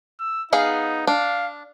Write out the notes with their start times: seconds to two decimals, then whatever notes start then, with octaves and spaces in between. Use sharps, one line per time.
0.20 E6
0.53 B3 D#4 G#4 F5
1.07 D4 F5